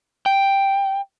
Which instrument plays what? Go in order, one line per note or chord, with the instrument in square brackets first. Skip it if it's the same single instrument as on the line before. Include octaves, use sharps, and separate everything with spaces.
[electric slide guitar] G5